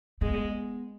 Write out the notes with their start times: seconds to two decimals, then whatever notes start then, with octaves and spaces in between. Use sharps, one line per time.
0.21 G#3 B3